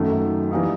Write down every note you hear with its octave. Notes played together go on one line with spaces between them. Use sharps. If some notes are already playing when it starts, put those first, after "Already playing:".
Already playing: F#2 D#3 F#3 A3
E3 G3 A#3 D#4